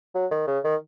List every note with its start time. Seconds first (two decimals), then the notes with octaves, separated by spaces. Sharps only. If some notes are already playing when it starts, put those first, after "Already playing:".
0.15 F#3
0.31 D#3
0.47 C#3
0.64 D#3